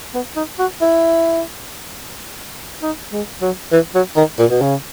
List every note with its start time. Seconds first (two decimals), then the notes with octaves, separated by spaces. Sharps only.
0.14 B3
0.36 D#4
0.59 F#4
0.81 E4
2.82 D#4
3.12 G#3
3.42 F#3
3.72 E3
3.95 F#3
4.16 D#3
4.39 A#2
4.50 B2
4.61 C#3